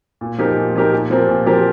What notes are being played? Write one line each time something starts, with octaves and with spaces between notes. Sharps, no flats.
A#2
F3 D#4 G4 A#4
A#2
F3 D#4 G4 A#4
A#2
F3 C4 G4 A#4
A#2
F3 C4 G4 A#4